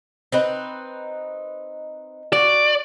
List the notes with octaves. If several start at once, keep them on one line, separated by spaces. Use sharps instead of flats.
C4 D#4 B4
F#4 D5